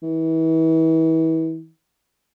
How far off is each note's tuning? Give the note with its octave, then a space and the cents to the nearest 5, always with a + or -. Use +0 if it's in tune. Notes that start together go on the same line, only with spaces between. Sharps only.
E3 -35